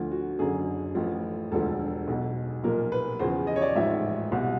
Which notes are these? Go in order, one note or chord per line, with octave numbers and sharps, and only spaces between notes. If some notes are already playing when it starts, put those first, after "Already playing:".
Already playing: D2 D3 F3
F#4
F#1 F#2 D3 G#4
A1 A2 F3
E1 D2 D3 F3 A4
B1 B2
B1 A#2 F3 A#4
B4
E2 C#3 F3 C5
D#5
C#5
D5
A1 G#2 F3 E5
C2 B2